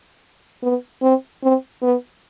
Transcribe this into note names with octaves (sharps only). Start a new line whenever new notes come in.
B3
C4
C4
B3